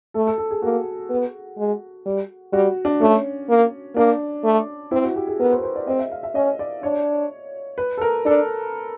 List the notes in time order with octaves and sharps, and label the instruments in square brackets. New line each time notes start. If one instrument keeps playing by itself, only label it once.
[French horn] A3 [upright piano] A4
[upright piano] A4
A4
G#4
[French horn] A#3 [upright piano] F#4
[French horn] B3
G#3
G3
[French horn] G3 [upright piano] F#4
[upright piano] D4
[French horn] A3 [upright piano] C#4
[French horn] A#3
[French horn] A#3 [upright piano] D4
[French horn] A3
[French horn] C4 [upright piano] E4
[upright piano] F#4
G4
G#4
[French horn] B3 [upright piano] A#4
[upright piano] C5
B4
C5
D5
[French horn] C4 [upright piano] D#5
[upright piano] E5
F5
E5
[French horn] C#4 [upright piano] D#5
[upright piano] D5
[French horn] D4 [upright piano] C#5
[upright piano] B4
A4
A#4
[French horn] D4 [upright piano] A4